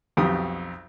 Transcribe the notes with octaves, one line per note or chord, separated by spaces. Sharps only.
B1 F2 G4 D#6